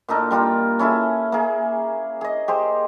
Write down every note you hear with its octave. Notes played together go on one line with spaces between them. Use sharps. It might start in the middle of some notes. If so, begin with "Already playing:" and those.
A#2 D4 D#4 A4
G3 D4 F4 A#4
C#4 E4 G#4 A4
A#3 G#4
G#4 D#5
G4 G#4 C5